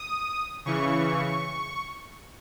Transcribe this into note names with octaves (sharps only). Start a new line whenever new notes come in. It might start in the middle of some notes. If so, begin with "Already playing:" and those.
Already playing: D#6
C#3 E3 C#6